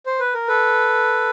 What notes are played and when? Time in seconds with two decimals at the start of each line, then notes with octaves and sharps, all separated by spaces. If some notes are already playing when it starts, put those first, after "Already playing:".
0.06 C5
0.20 B4
0.34 A#4
0.48 A4 B4